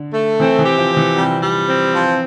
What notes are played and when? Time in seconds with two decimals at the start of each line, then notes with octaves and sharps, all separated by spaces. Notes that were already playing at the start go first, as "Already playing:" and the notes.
Already playing: D3
0.14 A3
0.40 E3 C4
0.59 E3
0.65 G4
0.78 F3
0.91 C4
0.97 E3
1.17 C3 G3
1.43 G3
1.68 C4
1.94 F3